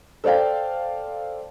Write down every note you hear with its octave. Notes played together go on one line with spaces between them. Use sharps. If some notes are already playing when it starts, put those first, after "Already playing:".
A4 C5 D5 F5 G5